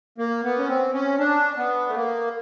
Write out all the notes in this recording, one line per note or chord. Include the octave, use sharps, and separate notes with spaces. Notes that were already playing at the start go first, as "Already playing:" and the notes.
A#3
B3
C#4
C4
C#4
D4
B3
A3
A#3